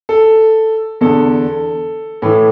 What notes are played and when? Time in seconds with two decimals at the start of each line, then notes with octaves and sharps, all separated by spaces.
0.09 A4
1.01 E2 D3 A4
2.22 A2 E3